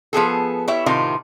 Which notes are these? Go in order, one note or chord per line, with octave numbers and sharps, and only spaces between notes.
F3 B3 G#4 A4
E4 G4 C#5 E5
A2 C3 D#3 F4